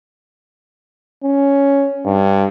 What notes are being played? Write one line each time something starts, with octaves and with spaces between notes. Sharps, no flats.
C#4
G2